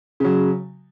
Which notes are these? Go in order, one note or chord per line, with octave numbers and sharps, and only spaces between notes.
C#3 F#3